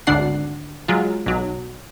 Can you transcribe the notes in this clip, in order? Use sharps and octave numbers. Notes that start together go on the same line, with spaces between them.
G#1 D2 D3 D4 F#5 C7
F#3 G#3 F4
B1 F#3